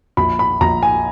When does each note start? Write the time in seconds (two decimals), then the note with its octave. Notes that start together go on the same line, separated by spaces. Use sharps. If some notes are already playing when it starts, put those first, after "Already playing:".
0.17 A#1 B5
0.39 B5
0.61 A#1 A#5
0.83 G#5